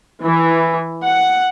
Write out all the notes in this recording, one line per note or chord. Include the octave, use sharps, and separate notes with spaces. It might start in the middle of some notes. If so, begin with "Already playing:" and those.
E3
F#5